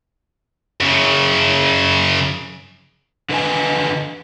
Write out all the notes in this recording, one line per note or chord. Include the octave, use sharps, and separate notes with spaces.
F#2 C#3
D3 B4 D#5 G#5